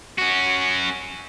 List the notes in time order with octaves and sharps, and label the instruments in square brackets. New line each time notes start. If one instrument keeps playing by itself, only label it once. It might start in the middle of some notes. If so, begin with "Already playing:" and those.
[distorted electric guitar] C#4 F#4